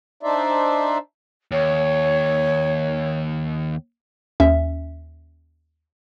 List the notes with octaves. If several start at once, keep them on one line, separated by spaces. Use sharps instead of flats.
D4 D#4 C5 D5 E5
D#2 C#5
D#2 C#4 E5